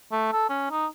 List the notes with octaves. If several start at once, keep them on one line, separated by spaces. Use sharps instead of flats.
A3
A4
C#4
D#4